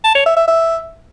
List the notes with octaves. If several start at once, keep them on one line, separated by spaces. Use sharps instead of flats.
A5
C#5
E5
E5
E5